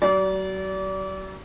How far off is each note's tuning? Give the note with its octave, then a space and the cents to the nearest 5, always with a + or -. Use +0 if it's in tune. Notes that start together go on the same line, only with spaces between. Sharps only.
F#3 +40 D5 -30